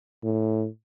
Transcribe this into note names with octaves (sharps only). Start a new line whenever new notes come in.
A2